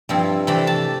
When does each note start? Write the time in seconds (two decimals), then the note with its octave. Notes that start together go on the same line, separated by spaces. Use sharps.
0.09 G2 F3 C4 E4
0.47 C3 E3 A3 D4 B5
0.67 A5